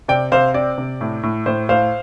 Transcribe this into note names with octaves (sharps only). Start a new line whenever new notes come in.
C3 D5 G5
C3 C5 F5
C4 D5
C3
A2
A2
A2 C5
A2 C5 F5